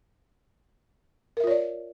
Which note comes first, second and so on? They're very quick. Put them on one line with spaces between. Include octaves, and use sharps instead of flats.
A#4 E5 F4 C#5 D5